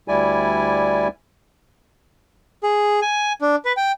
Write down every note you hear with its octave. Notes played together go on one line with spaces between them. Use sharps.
D2 G3 E4 D5 G#5
G#4
G#5
D4
B4
G5